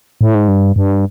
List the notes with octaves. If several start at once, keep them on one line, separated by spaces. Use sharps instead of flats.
A2
G#2
G2
G2